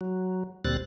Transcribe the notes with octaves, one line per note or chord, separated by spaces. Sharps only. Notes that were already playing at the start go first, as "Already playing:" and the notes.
F#3
D2 A#2 G3 C4 F#6 A6